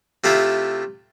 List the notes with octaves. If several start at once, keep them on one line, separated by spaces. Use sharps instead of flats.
C3 A3 E4 F4